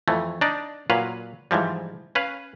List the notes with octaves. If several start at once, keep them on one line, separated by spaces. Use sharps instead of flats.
F2 E3 A3
D4 D#4 D5
A#2 F#3 B4 F5
G#2 E3 F3 G3
C#4 B4 F5